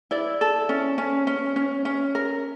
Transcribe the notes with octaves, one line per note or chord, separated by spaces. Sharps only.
E4 D5
A4
C#4
C#4
C#4
C#4
C#4
A#4